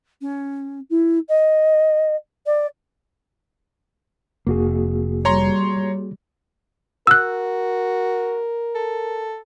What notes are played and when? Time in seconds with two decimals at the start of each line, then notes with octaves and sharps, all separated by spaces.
0.21 C#4
0.90 E4
1.28 D#5
2.46 D5
4.47 F1 A#3 F#4 G#4
5.25 G3 C#5 A#5 C6
7.07 F#4 A#4 E6 F#6
8.75 A4